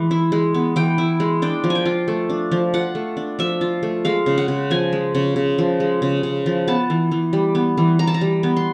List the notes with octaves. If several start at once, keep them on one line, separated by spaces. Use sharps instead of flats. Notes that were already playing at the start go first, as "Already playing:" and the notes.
Already playing: E3 G#3
E4
G#3
B3
E3 G5
E4
G#3
D4 G5
F3
G5 G#5
F4
A3
D4
F3
F4 F#5
A3
D4
F3 E5
F4
A3
G#3 F5
C#3
F#5
C#3
F3 G#5
G#3
C#3
C#3
F3
G#3
C#3
C#3
F3
B3 A5
E3
E3
G3
B3
E3
E3 A#5
A5
A#5
G3
B3
C6